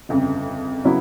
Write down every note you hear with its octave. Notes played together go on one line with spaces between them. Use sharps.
G1 F2 C#3
C#3 F#3 B3 E4